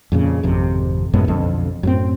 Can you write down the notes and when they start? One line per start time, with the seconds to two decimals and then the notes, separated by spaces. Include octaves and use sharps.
0.12 F2 A#2 C#3
0.43 G#1 F2 C3
1.13 F#2 A2 G#3 B3
1.28 B1 F2 D3
1.83 F#2 A2 C4